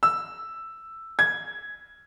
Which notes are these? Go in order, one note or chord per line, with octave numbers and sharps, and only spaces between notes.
E6
G#6